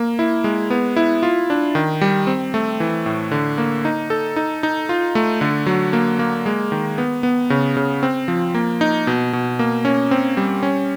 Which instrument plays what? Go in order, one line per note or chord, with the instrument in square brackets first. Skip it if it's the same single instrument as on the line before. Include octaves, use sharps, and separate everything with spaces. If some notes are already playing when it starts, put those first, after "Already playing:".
Already playing: [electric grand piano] A#3
E4
G#3
B3
E4
F4
D4
D#3
G3
C4
A3
E3
A2
D3
A#3
D#4
A4
D#4
D#4
F4
A3
D3
F#3
A#3
A#3
G#3
D#3
B3
B3
C#3
C#3
C4
F3
A#3
D#4
B2
B2
A#3
C#4
C4
G3
C#4